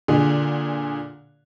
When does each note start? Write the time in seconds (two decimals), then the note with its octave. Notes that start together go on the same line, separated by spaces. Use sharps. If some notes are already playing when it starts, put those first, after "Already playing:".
0.08 A#2 D3 G#4